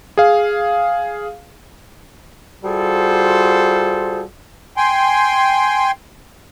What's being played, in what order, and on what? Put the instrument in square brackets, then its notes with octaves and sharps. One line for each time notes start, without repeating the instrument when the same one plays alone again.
[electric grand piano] G#4 F5
[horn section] G3 F4 F#4 G#4 A4 C5
[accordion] G5 G#5 C6